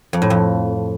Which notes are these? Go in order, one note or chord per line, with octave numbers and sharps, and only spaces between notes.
F2
A2
F2